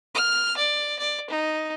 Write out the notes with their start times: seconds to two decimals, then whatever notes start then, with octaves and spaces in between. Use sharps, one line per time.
0.15 F6
0.57 D5
0.99 D5
1.30 D#4